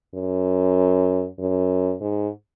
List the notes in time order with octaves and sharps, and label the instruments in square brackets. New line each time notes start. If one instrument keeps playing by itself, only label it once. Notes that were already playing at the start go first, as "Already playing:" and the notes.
[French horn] F#2
F#2
G#2